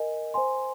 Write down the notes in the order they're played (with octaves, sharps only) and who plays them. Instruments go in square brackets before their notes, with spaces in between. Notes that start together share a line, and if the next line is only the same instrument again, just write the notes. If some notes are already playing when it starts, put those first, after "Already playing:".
Already playing: [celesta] A#4 D#5 G#5
C5 G#5 C6